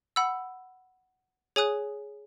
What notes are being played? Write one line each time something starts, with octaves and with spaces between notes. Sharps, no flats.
F#5 B5 E6
G#4 C#5 G#5 D#6 F#6